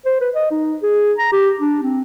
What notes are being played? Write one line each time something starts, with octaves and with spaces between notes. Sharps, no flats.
C5
B4
D#5
D#4
G#4
A#5
G4
D4
C4